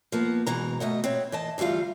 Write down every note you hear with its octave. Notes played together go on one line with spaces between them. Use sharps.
F3 A#3 B3
G#2 B2 E3 A#5
B2 A3 D#5 F#5
C4 B4 C#5
E3 D#5 A5
D2 E3 G3 F4 F5